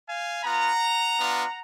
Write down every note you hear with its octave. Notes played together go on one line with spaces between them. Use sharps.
F5 G#5
B3 F4 F#5 A#5
B3 D4 F4